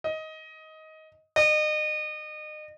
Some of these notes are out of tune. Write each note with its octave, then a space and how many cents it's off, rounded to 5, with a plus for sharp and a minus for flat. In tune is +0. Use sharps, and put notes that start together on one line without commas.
D#5 +15
D#5 -35